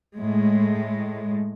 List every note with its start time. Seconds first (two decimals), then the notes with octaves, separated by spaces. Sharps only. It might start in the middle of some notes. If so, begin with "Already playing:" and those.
0.15 A2 G#3